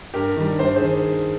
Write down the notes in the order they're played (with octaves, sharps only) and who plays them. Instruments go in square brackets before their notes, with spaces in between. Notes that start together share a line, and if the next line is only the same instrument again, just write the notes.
[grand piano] G2 G4 A#4
D#3 G3
G2 C5
G#4 C5
D#3